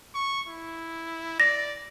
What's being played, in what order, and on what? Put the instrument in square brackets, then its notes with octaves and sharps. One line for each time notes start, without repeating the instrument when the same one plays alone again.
[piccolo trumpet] C#6
E4
[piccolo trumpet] D5 [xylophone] A#6